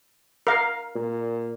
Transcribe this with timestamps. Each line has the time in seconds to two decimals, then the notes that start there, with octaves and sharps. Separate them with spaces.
0.47 A#4 F5
0.95 A#2